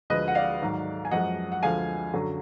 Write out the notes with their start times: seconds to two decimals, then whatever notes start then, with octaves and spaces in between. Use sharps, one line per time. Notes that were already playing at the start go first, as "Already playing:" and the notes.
0.10 D2 D3 F3 G#3 B4 D#5
0.28 F#5
0.35 D5 F5
0.61 G#2 D#3 F#3
1.05 G#5
1.11 F#2 F3 G#3 D#5 F#5
1.52 F#5
1.62 D2 D3 F3 G#3 F5 G#5
2.13 F#2 D3 F#3